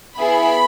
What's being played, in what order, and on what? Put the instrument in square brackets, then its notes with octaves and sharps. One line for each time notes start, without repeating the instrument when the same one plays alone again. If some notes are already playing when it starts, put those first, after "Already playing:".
[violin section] B3 E4 G#4 B5